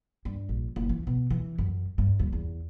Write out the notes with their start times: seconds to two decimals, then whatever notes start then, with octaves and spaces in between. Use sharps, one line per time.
0.25 G2
0.49 A#1
0.76 F#1
0.89 E3
1.07 B2
1.30 E3
1.58 F#2
1.98 G2
2.19 D#2
2.33 E2